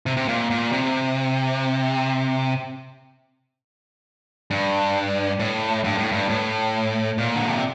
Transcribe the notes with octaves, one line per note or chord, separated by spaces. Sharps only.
C3
C3
A#2
A#2
C3
G2
A2
G2
A2
G2
A2
A#2
D3
C3